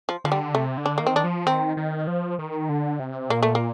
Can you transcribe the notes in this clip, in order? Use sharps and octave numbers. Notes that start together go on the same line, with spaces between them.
F3
D3 F3
G3
C3 A3
D3
D4
D#3 A#3
C4
D4
F3
D#3 C4
D#3
F3
D#3
D3
C3
A#2 A#3
A3
A#3